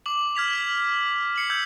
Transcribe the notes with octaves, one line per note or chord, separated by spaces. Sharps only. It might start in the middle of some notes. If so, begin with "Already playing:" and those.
D6 F#7
F6 G#6 B6 F7
F#7
C7 C#7 F#7
E6 G6 G#6 F#7